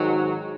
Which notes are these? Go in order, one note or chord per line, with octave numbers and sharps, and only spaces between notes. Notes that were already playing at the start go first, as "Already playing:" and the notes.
Already playing: G#2 D#3 F#3